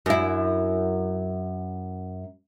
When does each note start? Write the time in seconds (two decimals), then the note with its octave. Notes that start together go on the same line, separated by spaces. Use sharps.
0.06 F#2 E4